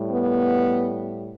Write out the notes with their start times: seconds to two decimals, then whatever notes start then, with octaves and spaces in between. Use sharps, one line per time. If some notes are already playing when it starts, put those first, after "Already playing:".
Already playing: A2 G3
0.12 B3